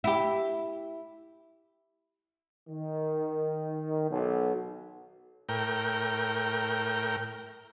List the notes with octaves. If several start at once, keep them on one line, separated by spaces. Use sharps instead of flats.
E4 G4
D#3
B1
A2 A#4 G5